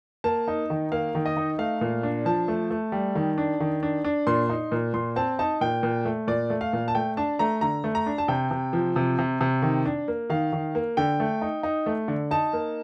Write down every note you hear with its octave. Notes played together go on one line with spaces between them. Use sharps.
A#3 A5
D#4
D#3
A#3 F5
D#3
D#5
D#4
A3 F5
A#2
D4
F3 A5
A3
A3
G3
D#3
D4
D#3
D4
D4
A#2 C6
D#4
A#2
A#2 C6
C4 A5
D#4 A5
A#2 G5
A#2
A3
A#2 D5
A3
F5
A#2
A5
A3 G5
D4 A5
A3 A#5
D3 A#5
A3
A#5
D4
A5
C3 G5
C3
F3
C3
C3
C3
D#3
D4
A#3
D#3 F5
D#3
A#3
D3 G5
A3
D#4
D#4
A3
D3
D#4 A5
A#3